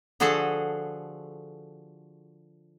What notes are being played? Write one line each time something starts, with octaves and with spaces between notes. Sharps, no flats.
D3 F3 F#4 G#4 A4 A5